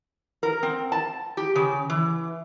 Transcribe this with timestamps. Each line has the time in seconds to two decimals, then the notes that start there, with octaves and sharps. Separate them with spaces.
0.43 A#4
0.63 C4
0.92 A5
1.37 G4
1.55 C#3
1.90 E3